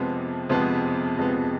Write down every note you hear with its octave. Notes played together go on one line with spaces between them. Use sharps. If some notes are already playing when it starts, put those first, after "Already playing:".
Already playing: F2 C3 F3 G#3 B3
F2 C3 F3 G#3 B3
F2 C3 F3 G#3 B3